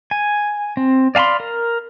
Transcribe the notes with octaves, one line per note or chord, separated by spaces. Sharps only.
G#5
C4
D5 F5 G#5 B5 C6
A#4